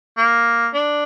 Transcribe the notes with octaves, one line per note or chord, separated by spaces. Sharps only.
A#3
D4